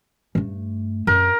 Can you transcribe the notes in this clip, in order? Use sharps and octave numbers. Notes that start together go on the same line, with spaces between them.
G2 A3
F#2 A#4